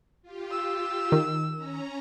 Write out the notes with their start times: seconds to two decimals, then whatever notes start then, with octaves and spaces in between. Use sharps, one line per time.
0.22 F4 G4
0.51 E6
1.12 D#3
1.56 C#4 A#5